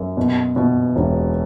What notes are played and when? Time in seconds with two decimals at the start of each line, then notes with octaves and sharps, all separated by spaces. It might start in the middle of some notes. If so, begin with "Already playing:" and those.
Already playing: F#2
0.17 B2
0.56 B2
0.96 E1